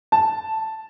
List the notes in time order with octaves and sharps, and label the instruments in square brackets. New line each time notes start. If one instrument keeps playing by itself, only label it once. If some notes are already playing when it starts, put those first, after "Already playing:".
[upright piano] A5